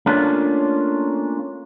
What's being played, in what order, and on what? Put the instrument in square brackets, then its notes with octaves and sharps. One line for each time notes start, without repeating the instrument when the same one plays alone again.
[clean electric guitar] A3 A#3 C#4 D4 F4